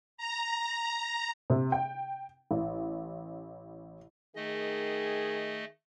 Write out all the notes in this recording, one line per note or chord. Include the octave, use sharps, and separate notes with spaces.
A#5
C3
G5
A1
D#3 A3 G#4 D#5